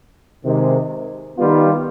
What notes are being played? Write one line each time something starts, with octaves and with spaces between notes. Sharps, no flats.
C3 D#3 G#3
D#3 G3 B3 F4